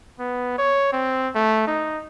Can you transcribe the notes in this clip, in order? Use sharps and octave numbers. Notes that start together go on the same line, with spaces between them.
B3
C#5
C4
A3
D#4